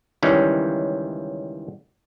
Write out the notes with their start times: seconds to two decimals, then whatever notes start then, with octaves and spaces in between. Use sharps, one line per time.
0.22 C#2 D#3 E3 G3 C#4